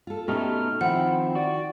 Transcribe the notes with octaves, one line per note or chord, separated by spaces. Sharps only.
F4 A4
B2 A3 C#4 D#4 G4 F6
D#3 F3 C4 E4 F#5
F#4 D5